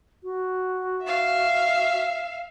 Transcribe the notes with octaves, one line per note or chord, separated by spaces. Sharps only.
F#4
E5 F5